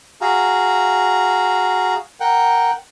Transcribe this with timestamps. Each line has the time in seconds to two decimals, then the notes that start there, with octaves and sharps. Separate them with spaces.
0.21 F#4 G#4 F5 A#5
2.20 A#4 F#5 G5